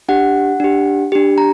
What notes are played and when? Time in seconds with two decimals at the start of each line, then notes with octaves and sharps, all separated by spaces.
0.09 D4 G4 F#5
0.60 D4 G4
1.12 D4 G4
1.38 A#5